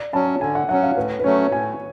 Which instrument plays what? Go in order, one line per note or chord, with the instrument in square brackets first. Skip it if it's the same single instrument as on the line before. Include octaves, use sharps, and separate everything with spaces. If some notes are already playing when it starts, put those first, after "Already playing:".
Already playing: [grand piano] D5
[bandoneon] F#3 C#4 [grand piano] A5
[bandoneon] D3 [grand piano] G#5
[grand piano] F#5
[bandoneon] F#3 C#4 [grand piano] F#5
[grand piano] F5
[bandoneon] A2 [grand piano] B4
[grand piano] B4
[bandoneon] F#3 A3 C#4 [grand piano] C#5
[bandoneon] A2 [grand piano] G#5